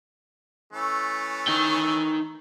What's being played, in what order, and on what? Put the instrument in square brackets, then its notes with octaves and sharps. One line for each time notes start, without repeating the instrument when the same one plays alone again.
[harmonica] E3 A3 C#4
[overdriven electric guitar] D#4 G5